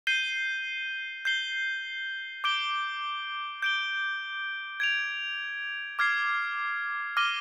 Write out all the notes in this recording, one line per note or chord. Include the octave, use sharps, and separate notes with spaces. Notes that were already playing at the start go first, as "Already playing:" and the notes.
G6 C7 D#7 G7
G6 C7 G7
D6 G6 D7 G7
G6 D7 G7
G#6 D7 F7
D6 F6 G#6 C7
D6 F6 A#6 D#7 G7